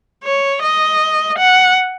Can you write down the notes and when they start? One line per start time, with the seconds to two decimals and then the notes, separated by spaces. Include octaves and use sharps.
0.24 C#5
0.62 D#5
1.38 F#5